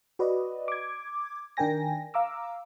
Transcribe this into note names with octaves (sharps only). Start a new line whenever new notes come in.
F#4 B4 D5 D#5
D6 G#6
D#3 D4 A#4 G5 G#5 A#6
F5 A#5 D6 E6